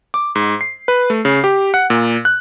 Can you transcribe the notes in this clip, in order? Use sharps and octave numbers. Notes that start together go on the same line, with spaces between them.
D6
G#2
C7
B4
A3
C#3
G4
F#5
A#2
F#6